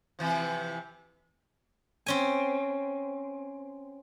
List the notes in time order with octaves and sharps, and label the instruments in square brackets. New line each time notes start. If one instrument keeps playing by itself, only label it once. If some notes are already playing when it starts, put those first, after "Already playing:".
[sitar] C3 E3 F3
[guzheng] C4 C#4 G#5